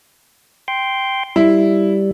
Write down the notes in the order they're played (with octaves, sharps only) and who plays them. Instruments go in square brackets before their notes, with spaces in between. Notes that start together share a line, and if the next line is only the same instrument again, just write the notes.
[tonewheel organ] G5 C6
[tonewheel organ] G3 [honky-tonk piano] E4